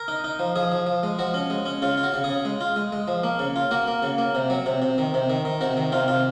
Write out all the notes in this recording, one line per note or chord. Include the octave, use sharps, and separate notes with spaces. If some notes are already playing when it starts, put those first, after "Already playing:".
Already playing: A#4
D#4
D#4
F3
F3 G#4
F3
F3
G#3
F3 F#4
C#4
G#3
C#4
C#3 F4
F4
F#4
C#3
G#4
C#3
G#3
F4
G#3
G#3
F3
A#3
C#3
F4
A#3 F#4
A#3
C#3
A#3
C3
F#3
C3
C3
D#3
C3
D#3
D#3
C3 F#4
D#3
C3 F4
C3 F4